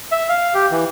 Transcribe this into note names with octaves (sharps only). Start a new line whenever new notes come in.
E5
F5
G4
E3